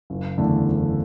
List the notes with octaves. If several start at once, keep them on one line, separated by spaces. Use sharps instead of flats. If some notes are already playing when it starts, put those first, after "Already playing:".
F#1
E2 D3 A3
F#1